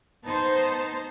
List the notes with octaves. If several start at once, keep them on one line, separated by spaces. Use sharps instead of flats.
B3 D#4 C5 A5